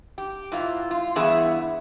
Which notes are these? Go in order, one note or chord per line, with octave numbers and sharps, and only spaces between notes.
G4
G#2 E4 F4
F4
G2 E3 B3 E4 G#4 E5